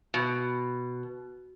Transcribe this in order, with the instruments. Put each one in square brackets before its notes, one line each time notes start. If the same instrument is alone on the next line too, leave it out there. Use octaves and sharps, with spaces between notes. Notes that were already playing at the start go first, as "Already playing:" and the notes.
[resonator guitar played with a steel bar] B2